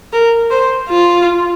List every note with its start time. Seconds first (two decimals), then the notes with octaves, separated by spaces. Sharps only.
0.13 A#4
0.51 C5
0.90 F4